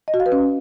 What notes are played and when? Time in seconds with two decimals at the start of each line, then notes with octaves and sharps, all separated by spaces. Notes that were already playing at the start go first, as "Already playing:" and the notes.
0.08 D#5
0.14 F#4
0.20 F5
0.26 B4
0.32 C#4